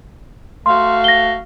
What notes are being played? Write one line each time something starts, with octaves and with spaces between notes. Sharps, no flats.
A3 F#4 F5 C6
A#6 G7